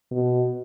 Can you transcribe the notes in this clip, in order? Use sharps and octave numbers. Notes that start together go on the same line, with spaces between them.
B2